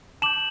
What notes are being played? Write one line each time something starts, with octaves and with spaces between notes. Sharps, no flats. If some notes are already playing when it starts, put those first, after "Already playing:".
A5 D6 G6 E7 F#7